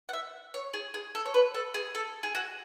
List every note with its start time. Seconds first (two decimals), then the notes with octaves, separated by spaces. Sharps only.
0.09 F#5
0.13 E5
0.54 C#5
0.73 G#4
0.94 G#4
1.15 A4
1.25 C#5
1.34 B4
1.54 A4
1.74 G#4
1.95 A4
2.23 G#4
2.35 F#4